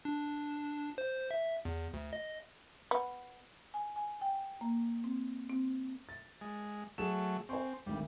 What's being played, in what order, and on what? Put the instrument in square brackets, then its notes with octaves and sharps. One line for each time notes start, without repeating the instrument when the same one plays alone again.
[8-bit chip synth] D4
C5
E5
E2
D2
D#5
[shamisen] B3
[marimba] G#5
G#5
G5
A#3
C4
C4
[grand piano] A6
[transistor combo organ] G#3
[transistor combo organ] F#3 A3 [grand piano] G#4 E7
[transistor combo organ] C4 [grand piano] C5 G#5 C#6
[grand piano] G#1 D2 D#3 [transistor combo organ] G3